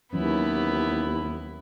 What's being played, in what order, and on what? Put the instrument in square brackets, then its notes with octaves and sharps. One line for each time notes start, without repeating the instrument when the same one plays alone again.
[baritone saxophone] D#2 [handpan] E3 F#3 C#4 [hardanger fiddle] B3 E4